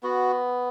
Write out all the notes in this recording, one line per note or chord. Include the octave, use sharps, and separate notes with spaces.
B3 F#4